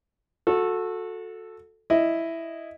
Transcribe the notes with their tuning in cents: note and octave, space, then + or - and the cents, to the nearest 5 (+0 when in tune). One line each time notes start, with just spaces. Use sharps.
F#4 -25 A4 +0
E4 +0 D#5 +0